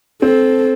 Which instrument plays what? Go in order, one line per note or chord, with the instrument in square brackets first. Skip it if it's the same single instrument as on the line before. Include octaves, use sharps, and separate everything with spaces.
[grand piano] C4 C5 [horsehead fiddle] A4